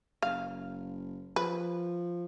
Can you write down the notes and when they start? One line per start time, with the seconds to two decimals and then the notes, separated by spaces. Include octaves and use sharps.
0.23 F#1 F5
1.36 F3 B4